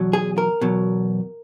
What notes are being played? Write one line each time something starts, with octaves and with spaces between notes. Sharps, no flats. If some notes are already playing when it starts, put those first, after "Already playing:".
Already playing: E2 B2 F#3
G#4
A#4
E2 B2 F#3